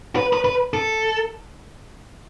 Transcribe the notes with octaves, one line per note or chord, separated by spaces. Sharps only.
B4
B4
B4
A4